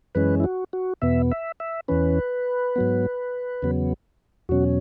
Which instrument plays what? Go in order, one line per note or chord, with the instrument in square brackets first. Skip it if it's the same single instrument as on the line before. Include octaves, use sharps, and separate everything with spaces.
[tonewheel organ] F#2 E3 G#3 C#4 B4
E4
F#4
F#4
E2 B2 B3 E5
E5
E5
E2 E3 C#4 B4
G#2 F#3 B3
E2 C#3 F#3 B3
E2 B2 F#3 C#4 F#4